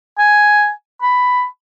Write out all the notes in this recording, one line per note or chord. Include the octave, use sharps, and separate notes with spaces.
G#5
B5